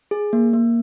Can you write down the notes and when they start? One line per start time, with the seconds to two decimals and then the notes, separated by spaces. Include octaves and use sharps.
0.11 G#4
0.33 A#3
0.53 A#3